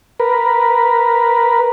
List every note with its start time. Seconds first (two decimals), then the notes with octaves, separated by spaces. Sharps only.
0.20 A#4 B4